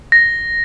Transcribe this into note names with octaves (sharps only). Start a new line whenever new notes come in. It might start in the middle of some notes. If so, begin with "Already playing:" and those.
A#6